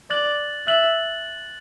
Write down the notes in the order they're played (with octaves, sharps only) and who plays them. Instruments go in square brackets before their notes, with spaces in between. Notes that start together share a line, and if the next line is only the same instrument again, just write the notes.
[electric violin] D5 [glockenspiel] F#6 A6 F#7
[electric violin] E5 [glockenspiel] F#6 A6 F#7